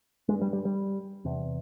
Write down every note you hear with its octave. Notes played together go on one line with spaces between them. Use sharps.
G2 G#3
G3
G3
G3
E2 C3